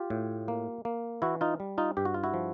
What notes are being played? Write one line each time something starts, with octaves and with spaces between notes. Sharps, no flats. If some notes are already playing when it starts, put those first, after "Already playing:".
Already playing: F4 G4
A2
A#3
A#3
E3 E4 F#4
D#4 F4
G3
D#4 F4
G2 G4
F#4
F4
E4 F#4
F3